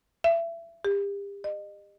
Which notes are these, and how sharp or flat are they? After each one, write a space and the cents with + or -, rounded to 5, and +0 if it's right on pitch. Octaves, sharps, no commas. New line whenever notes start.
E5 +30
G4 +35
D#5 -35